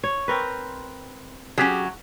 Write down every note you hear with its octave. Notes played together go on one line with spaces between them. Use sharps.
C#5
C4 A#4 B4
F#3 C#4 G4 G#4